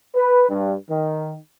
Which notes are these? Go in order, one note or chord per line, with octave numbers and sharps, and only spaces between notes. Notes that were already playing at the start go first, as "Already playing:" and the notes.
B4
G2
D#3